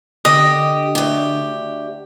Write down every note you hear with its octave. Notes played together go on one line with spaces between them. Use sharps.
D3 G4 D#5
D2 G4